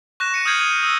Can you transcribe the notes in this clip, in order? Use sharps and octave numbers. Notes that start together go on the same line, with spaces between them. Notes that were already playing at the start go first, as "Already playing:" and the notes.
C#6 F#6 A#6 E7
C#7 D#7 E7
D#6 F6 G6 G#6 C7 F#7
D#6 G6 D#7
D#6 E6 G6